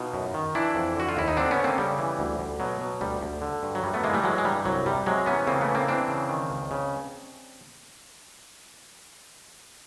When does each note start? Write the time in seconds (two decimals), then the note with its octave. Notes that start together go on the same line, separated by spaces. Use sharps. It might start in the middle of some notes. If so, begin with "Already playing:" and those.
Already playing: B2 D#4 F4
0.14 F#2
0.34 D#3
0.55 E3 D4 E4
0.75 F2
0.97 D3 F#4
1.09 F4
1.17 D#2 E4
1.28 D#4
1.37 D3 C4 D4
1.51 B3 C#4
1.57 D3
1.64 A#3 C4
1.78 C#3 G3
1.99 E3
2.19 D2
2.39 D2
2.60 B2 F#3
2.81 B2
3.01 D2 G3
3.21 D2
3.42 D3
3.63 G2
3.75 F#3
3.83 F#2 G3
3.94 A3 B3
4.04 E3 G#3 A#3
4.13 G3 A3
4.24 E3 F#3 G#3
4.38 G#3
4.44 G2 G3
4.65 C2 F#3
4.86 C3 G3
5.06 C3 F#3 G#3
5.26 E3 B3 C#4
5.47 C#3 A#3 C4
5.61 A3 B3
5.68 E3
5.75 A#3 C4
5.88 E3 C4 D4
6.08 C#3
6.29 D#3
6.50 C#2
6.71 C#3